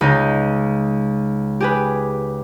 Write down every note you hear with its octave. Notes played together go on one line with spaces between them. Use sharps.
C#2 D#4 G6
G4 G#4 B4